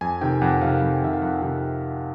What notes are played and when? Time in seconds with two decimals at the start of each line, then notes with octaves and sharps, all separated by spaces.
0.01 F2 G#5
0.21 C3 D#3 G5
0.41 F2 F#5
0.62 C3 D#3 F5
0.82 F2
1.03 C3 D#3 E5
1.13 F5
1.22 F2 F#5
1.42 C3 D#3